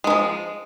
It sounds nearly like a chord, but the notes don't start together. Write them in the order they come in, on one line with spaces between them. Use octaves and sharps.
G#3 D#3 F3